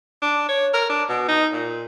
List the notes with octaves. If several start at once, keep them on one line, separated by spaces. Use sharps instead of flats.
D4
C#5
A#4
D4
B2
D#4
A#2